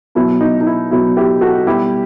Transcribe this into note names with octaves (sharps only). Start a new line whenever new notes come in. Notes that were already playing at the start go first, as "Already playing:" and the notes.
B2 F#3 E4
D#4
D#4
E4
B2 F#3 E4
E4 G4
F#4 A4
B2 G3 E4 G4